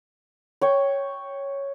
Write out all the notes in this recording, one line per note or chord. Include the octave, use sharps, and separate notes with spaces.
C#5 G5